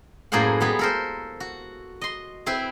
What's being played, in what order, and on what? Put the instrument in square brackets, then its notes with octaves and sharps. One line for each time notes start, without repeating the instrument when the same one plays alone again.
[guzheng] F#2 A2 A#3 G#4 C5 F#5
G3 G#3 B3 G#4
A4 A#4 C5
F#4
D#5 C6
C4 E4 B4 C5